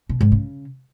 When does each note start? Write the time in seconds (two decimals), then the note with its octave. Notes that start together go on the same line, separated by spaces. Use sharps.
0.09 B2
0.21 G#2
0.32 C#3